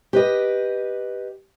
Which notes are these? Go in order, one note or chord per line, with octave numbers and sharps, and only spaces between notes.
G4 B4 D#5